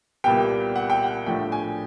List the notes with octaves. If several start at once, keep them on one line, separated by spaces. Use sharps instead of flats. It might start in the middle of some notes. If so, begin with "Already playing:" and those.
C2 A#2 G3 B3 G5
F#5
G5
F#5
A2 F3 A3 D4 G5
G#5